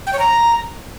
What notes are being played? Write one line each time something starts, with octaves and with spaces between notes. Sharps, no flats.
G5
C#5
A#5